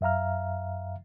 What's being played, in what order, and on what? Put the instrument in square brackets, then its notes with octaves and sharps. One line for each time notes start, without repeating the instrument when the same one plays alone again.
[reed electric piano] F#2 E5 F5 A#5 F6